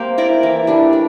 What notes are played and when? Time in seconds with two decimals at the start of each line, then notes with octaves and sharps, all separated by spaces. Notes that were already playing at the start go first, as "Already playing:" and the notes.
Already playing: A#3 C4 G4 C5
0.18 E4 A#4 D5
0.43 E3
0.67 G3 D4
0.93 A3